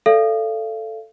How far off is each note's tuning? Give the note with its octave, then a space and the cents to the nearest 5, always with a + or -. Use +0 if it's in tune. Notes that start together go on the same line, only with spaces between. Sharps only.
A4 +0 D5 +0 F5 -35